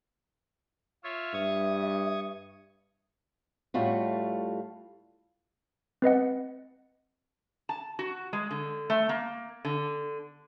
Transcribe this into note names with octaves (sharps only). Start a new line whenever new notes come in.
F4 C#5 E5
G2 E5 C#6 D#6 G#6
A2 G3 A3 F4 F#4
C4 B4 D#5 F#5
A5
F#4
G#3
D3
A3
A#3
D3